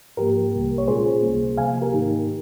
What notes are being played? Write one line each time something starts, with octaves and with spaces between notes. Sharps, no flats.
G#2 F3 A#3 G4 A#4
C2 C3 G3 A#3
C#5
A#2 G#3 C#4 F4 G#4 C5
C#2 C3 G3 A#3
C3 F3 A#3 F5 G#5
G4 A#4
G#2 D#3 A#3 D#4